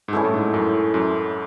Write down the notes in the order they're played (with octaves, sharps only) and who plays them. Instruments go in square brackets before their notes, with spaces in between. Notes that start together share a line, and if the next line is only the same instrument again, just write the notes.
[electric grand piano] G#2
[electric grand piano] G2 [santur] C#4 E4 A4
[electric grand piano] A2
G#2
F#2
F#2